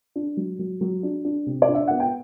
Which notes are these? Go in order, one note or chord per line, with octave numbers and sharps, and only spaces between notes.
D4
F#3
F#3
F#3
D4
D4
C3
D5
D4
E5
B3 F#5
G5